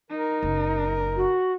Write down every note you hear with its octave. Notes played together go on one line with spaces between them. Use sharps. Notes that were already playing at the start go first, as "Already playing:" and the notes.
D#4 A#4
F#1
F#4